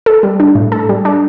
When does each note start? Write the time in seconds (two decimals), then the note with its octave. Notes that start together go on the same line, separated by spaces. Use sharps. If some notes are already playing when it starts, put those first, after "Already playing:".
0.06 A4
0.23 G3
0.40 D4
0.55 A2
0.72 A4
0.89 G3
1.05 D4